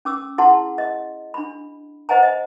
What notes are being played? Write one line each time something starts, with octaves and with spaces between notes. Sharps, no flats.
C#4 D6 E6
E4 G#4 F#5 A5 C6
D#5
D4 B5
C5 D#5 F#5 G#5 A#5
D#5